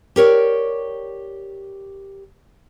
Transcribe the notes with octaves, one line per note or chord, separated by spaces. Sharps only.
G4 A#4 C#5 D5